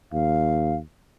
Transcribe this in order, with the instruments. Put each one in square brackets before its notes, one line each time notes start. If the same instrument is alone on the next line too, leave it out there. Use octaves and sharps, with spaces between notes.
[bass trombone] D#2 [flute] F5